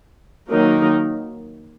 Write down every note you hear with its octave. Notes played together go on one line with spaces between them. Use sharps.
D#3 F#3 A#3 D#4 A#4